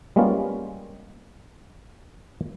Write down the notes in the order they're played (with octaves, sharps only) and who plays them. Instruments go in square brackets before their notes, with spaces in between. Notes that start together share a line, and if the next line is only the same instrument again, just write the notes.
[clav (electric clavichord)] G3 G#3 A#3 B3 C#4 F4